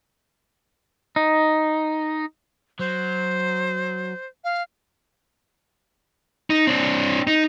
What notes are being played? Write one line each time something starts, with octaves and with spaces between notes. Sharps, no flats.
D#4
F#3 C5
F5
D#4
C4 D4
D#4